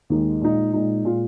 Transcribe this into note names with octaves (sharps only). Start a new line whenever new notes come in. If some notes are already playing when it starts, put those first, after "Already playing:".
D#2 D#3 G#3 D#4
A#2 G#3 D#4
A#2 G#3 D#4
A#2 G#3 F4